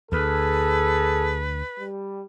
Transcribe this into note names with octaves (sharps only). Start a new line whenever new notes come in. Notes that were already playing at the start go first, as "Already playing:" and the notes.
D2 G#4 A4 B4
G3